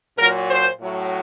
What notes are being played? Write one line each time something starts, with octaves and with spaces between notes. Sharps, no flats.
A#2 F#3 A#4
C5
A2 F#3